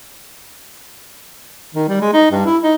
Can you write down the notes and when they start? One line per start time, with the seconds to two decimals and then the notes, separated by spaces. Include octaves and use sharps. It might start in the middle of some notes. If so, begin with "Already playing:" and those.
1.75 D#3
1.88 G3
2.01 G#3
2.13 D#4
2.31 G2
2.45 E4
2.63 D#4